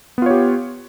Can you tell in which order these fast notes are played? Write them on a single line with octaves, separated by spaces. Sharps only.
B3 F4 C#5 G4